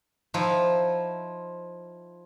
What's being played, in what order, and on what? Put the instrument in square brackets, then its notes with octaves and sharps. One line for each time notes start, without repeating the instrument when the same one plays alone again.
[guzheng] F3 D#4 E4